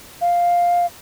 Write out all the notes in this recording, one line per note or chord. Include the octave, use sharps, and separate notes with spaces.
F5